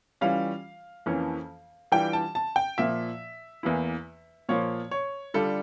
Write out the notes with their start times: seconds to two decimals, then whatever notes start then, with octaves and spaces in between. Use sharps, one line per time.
0.21 E3 G3 C#4 F4 F5
1.06 F2 E3 A#3 C#4
1.92 E3 G3 D4 F4 G5
2.13 A5
2.35 A5
2.56 G5
2.78 A#2 F3 A#3 E5
3.63 E2 E3 A#3 E4
4.49 A#2 F3 A#3 C#5
4.91 C#5
5.34 D3 G3 D4 F4 A4